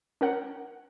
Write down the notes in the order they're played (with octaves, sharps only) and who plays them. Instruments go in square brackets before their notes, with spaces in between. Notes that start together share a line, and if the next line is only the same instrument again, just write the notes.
[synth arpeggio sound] C#4 A#4 F#5